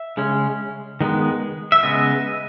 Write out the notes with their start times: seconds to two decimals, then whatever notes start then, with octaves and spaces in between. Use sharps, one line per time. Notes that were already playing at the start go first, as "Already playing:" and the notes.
Already playing: E5
0.17 C#3 G#3 C#4
1.00 D#3 G#3 B3
1.72 E5
1.82 C#3 G#3 B3 D#5